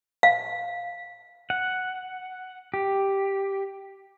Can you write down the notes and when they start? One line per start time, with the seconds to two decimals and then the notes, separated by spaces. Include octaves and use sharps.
0.23 F5
1.50 F#5
2.74 G4